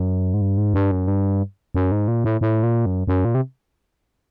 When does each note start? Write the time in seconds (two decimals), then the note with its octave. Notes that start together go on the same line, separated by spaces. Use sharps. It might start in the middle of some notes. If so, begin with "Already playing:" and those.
Already playing: F#2
0.34 G#2
0.41 G2
0.57 G#2
0.74 G2
0.91 F#2
1.08 G2
1.75 F#2
1.92 G#2
2.08 A#2
2.24 A2
2.41 A2
2.63 A#2
2.86 F#2
3.08 F#2
3.25 A#2
3.35 C3